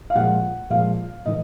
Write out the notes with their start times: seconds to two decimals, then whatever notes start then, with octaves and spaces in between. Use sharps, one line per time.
0.10 F5
0.15 A#2 F3 G#3 F#5
0.70 A#2 F3 G#3 F5
1.26 A2 E3 D#5